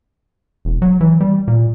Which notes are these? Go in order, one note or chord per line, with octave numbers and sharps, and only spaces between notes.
E1
F#3
E3
G3
A#2